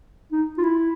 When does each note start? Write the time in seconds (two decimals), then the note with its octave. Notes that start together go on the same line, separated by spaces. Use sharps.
0.32 D#4
0.58 F4
0.63 E4